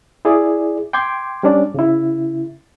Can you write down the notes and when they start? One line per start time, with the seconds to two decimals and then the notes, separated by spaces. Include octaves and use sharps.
0.25 E4 G#4 D5
0.93 G5 C6 D6 G#6
1.43 G3 C#4 D4 D5
1.74 C#3 E4